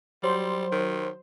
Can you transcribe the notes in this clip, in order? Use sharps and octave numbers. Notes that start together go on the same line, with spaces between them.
F#3 G3 C5 C6
D#3